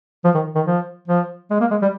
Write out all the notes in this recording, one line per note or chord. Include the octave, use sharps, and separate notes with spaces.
F3
D#3
D#3
F3
F3
G#3
A#3
G#3
G3